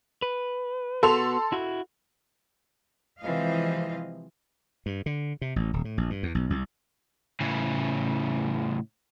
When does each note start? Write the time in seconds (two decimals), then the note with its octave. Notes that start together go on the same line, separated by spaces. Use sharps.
0.22 B4
1.03 B3 F#4 A4 C6 F7
1.52 E4 F#4
3.21 C3 E3 F3 G#3 D#5 F5
4.86 G2
5.06 D3
5.41 C3
5.56 A1
5.73 D#1
5.85 A2
5.98 A#1
6.10 G2
6.23 E2
6.35 B1
6.50 C2
7.40 A2 C#3